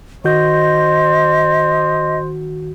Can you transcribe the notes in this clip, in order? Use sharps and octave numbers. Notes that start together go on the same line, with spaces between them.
D#3 F#4 C5 D#5 G6